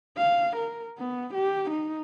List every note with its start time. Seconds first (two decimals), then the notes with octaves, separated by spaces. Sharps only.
0.17 F5
0.57 A#4
0.98 B3
1.34 G4
1.70 D#4